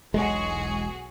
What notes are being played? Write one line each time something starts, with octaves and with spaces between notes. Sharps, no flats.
E1 B1 G#3 F#4 G#4